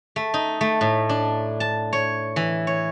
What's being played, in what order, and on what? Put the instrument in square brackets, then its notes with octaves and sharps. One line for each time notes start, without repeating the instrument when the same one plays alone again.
[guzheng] A3
D#4
A3
A2
D4
A5
C#5
E3
C#5